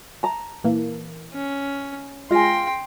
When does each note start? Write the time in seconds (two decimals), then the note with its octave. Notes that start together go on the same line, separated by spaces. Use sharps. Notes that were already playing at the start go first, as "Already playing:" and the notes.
0.23 A5 A#5
0.64 A#2 E3 A#3
1.34 C#4
2.31 G#3 F4 G5 G#5 C6 A#6